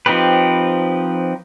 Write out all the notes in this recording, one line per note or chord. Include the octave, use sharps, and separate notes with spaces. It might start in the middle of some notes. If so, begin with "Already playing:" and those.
F3 C4 D#4 G4 B4